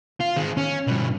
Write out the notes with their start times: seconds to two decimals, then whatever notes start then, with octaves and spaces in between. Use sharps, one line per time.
0.21 F4
0.37 D#3 G#3
0.58 C#4
0.88 G2 B2